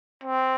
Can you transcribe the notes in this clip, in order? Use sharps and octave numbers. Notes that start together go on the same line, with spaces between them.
C4